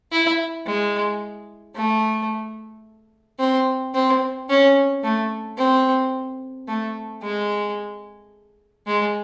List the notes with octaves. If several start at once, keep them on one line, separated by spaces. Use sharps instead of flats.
E4
G#3
A3
C4
C4
C#4
A3
C4
A3
G#3
G#3